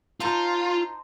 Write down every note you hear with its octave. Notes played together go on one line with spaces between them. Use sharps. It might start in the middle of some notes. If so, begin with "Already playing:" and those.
D#4 F4 C5 A5